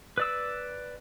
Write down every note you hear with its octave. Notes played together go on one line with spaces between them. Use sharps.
B4 D5 E6